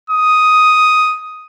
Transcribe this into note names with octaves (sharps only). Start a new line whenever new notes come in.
D#6